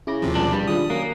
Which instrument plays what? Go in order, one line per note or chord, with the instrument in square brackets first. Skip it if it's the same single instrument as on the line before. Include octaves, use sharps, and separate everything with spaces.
[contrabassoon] C#3 [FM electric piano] E4 D6 A#6
[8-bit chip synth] D#2 C3 F3
[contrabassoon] C#2 [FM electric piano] B2 G3 G#4 [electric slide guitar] D4
[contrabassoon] G2 [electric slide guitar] G3 [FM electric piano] B5
[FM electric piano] D#3 G#3 D4 [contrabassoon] F3 [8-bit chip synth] D#6
[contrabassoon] F#2 [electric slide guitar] A#3 [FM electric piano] F#6